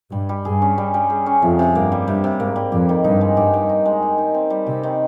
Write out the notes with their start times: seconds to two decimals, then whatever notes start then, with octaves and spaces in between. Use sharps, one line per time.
0.12 G2 G3
0.29 G3
0.45 G2 G#4
0.62 C#4
0.78 G3
0.94 G3
1.10 G#4
1.26 C#4
1.42 F2 C3
1.59 C3
1.75 G2 A#3
1.92 G3
2.07 G2 C3
2.24 C3
2.40 G#2 A#3
2.56 G3
2.72 F2 G4
2.89 D#3
3.04 G2 D#4
3.21 G#3
3.37 G2 G4
3.54 D#3
3.69 D#4
3.86 G#3
4.02 G4
4.18 D#3
4.34 C4
4.50 G3
4.67 C3 G4
4.83 D#3